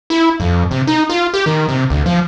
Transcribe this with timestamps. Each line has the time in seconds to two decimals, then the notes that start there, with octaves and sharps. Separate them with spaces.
0.10 E4
0.40 F2
0.71 C3
0.87 D#4
1.10 F4
1.34 G4
1.46 D#3
1.69 C3
1.90 D2
2.06 F3